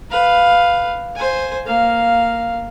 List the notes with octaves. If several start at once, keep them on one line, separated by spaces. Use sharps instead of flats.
B4 F5
C5 G#5
A#3 F5